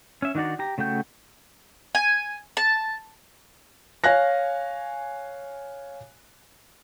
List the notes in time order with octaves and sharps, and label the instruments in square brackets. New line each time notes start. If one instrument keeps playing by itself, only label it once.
[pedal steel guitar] C#4 E5
D#3 D4 D#4 F#4 D5
G4 A#5
C#3 A3 F#4 G5 G6
[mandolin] G#5
A5
[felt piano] C#5 F5 G#5 F#6 A#6